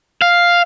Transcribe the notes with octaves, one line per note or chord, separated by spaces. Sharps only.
F5